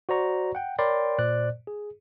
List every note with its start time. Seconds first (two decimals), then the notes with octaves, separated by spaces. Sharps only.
0.09 F#4 C5 D5 A#5 C#6
0.55 F#5 G5
0.79 A#4 C#5 D5 G5 B5 C6
1.19 A#2 C5 D5 F#6
1.67 G#4